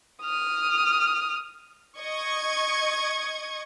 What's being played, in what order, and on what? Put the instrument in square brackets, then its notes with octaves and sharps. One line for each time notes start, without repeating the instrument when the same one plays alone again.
[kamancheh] D#6 F6
[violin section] D#5 C#6 G#6